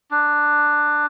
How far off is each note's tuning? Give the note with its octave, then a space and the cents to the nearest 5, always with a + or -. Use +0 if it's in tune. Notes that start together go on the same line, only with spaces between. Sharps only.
D4 +10